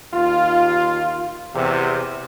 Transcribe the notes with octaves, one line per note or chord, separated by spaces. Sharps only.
D#2 F4
E2 C3